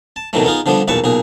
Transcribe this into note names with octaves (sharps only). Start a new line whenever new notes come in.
A5
B2 D#3 E3 F#3 A3
B3 D#4 F4 G#4
D3 F3 G3 B3 D4
B1 E2 A#2 B4 A5 C#6
B1 A#2 G#4